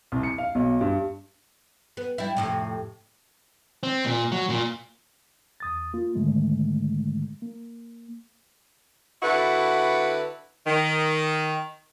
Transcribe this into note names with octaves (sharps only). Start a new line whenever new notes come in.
C2
C#7
F5
B1
G2
B3
G3 E4
F2 A2 C3
C4
A#2
F#3
A#2
E2 D#6 A6
A#3 F4
G#2 D3 D#3 G#3 A3
A#3
D3 E4 F#4 B4
D#3